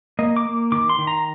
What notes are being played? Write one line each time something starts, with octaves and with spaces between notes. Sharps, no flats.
A#3 D#5
D6
A#3
D#3 D6
C6
D#3
A#5